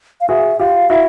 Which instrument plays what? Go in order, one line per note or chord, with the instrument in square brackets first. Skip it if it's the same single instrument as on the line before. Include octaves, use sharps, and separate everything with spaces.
[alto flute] F5
[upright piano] F#4 G#4 [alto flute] E5
[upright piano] F4 G4 [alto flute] F5
[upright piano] E4 F#4 [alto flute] E5